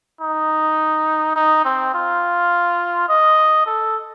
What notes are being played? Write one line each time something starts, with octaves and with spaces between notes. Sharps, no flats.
D#4
D#4
C4
F4
D#5
A4